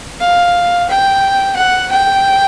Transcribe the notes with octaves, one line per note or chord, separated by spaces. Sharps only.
F5
G5
F#5
G5